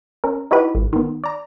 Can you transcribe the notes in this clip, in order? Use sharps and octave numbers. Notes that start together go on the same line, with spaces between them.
C#4 A#4
D#4 E4 F#4 G4 B4
G#1
D#3 B3
D5 A#5